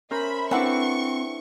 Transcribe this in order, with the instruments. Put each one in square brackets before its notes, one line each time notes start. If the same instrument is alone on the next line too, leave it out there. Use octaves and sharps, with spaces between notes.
[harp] C#4 A#4 C5 [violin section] E5 B5
[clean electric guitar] C4 [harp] D4 E4 B4 [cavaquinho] A4 F#5 D6 [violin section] C#6